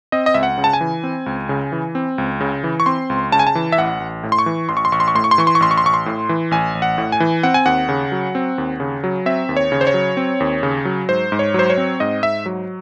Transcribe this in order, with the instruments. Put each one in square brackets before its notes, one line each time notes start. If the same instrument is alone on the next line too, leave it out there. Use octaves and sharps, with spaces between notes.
[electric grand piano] C4 D#5
D#5
C#2 E5
F#5
C#3
A5
G#5
E3
C4
C#2
C#3
E3
C4
C#2
C#3
E3
C#6
C4 C6
C#2
C#3 A5
G#5
A5
E3
E5
A1 F#5
A1
A2
C6
C#6
E3
A1 C6
C#6
C6
A1 C#6
C6
C#6
A2 C6
C#6
C6
E3 C#6
C6
C#6
A1 C6
C#6
C6
A1 C#6
C6
A2
E3
A1 G#5
A1
F#5
A2
G#5
E3
C4 F#5
G#5
D#2 F#5
C#3
F#3
C4
D#2
C#3
F#3
C4 E5
D#2
C#5
C#3
C5
C#5
F#3
C4
D#2
C#3
F#3
G#2 C5
G#2
C#5
F#3 C5
C#5
C4
G#2 D#5
G#2 E5
F#3